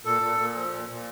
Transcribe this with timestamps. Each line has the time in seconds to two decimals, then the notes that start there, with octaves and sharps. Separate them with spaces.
0.05 A#2 A4
0.22 A#2
0.39 A#2
0.55 F3
0.72 A#2
0.89 A#2